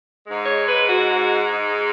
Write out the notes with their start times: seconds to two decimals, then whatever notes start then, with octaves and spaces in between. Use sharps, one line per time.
0.25 G#2 G#3
0.45 C#5
0.67 B4
0.87 F#4
1.51 D#4